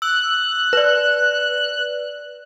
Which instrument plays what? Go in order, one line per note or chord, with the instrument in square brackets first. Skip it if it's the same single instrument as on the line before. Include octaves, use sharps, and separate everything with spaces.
[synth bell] E6 [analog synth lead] F#6
[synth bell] B4 D5